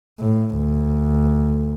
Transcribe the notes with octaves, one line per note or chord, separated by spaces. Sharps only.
A2
D2